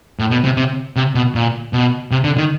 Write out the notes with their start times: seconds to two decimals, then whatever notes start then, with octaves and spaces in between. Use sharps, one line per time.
0.19 A2
0.31 B2
0.44 C3
0.57 C3
0.96 C3
1.15 B2
1.35 A#2
1.73 B2
2.11 C3
2.24 D3
2.38 D#3